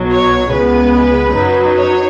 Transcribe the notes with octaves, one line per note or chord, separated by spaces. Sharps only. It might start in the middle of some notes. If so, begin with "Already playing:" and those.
Already playing: B1 B2 F#3
C#5
C#2 C#3 G#3 B3 B4
F#2 F#3 D#4
C#5